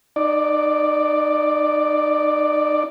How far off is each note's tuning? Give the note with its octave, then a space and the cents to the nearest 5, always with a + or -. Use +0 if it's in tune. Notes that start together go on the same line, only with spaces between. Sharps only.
D#4 -30 D5 +0